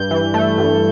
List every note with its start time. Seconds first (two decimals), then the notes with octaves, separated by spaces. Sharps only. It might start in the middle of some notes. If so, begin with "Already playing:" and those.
Already playing: G2 G6
0.11 E3
0.34 A3
0.58 G2